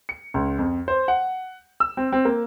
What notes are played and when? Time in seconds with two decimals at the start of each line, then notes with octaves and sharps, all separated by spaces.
0.09 C#7
0.34 C#2
0.59 F2
0.88 C5
1.08 F#5
1.80 E6
1.97 C4
2.13 C4
2.25 A#3